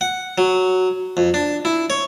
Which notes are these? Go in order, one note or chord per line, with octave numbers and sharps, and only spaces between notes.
F#5
F#3
F2
D4
E4
C#5